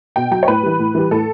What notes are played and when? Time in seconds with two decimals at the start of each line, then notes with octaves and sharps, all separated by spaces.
0.16 B2 G5
0.31 F#3 G5
0.43 C#5
0.48 A2 B4
0.63 E3 G3
0.79 A2
0.95 E3 G3
1.11 A2 A4